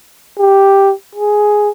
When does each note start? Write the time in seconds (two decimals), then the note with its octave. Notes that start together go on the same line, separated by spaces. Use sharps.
0.39 G4
1.15 G#4